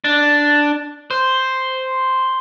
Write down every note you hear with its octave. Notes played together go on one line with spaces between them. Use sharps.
D4
C5